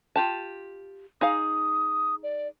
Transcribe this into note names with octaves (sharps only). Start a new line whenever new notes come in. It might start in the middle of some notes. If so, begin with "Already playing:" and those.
F4 G4 A5
D#4 G#4 F5 D#6
D5